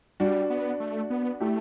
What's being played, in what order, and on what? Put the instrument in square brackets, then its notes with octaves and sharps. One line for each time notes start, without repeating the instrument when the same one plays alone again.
[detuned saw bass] G3 [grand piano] D4 F#4
[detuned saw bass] B3
A3
B3
[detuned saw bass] A3 [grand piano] E4 G4